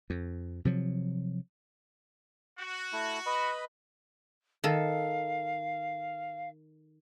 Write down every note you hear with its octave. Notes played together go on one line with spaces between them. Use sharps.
F2
C3 F3 F#3
F#4
A3 E4
B4 D#5 B5
D#3 A4 F5